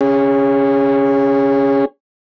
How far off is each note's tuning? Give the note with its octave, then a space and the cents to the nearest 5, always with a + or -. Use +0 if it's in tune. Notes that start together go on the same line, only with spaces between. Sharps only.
C#4 +0 G#4 -25